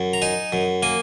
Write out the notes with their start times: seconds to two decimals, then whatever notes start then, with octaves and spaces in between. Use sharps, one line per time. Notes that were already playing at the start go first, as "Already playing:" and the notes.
Already playing: F#2
0.13 A#5
0.22 D#4 G#5
0.52 F#2
0.83 A#3 G#5